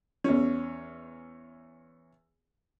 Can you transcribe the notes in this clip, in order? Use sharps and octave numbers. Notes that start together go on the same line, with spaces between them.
E2 C#4